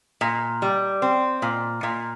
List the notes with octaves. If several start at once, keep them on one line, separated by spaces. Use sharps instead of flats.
A#2
G3
C4
A#2
A#2